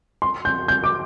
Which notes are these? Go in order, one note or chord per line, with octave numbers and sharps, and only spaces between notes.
C6
G6
G6
D6